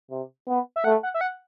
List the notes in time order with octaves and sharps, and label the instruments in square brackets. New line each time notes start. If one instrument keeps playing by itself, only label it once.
[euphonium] C3
B3
[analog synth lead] E5
[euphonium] A3 [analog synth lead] F#5
[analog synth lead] F#5
E5
F#5